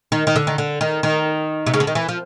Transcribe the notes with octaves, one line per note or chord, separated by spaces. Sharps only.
D#3
D#3
D3
D#3
D3
D#3
D#3
C3
C#3
D3
D#3
E3
F3